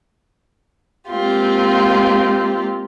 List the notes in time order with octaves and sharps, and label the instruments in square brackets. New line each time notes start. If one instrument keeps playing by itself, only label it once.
[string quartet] G#3 A#3 C4 F4 G4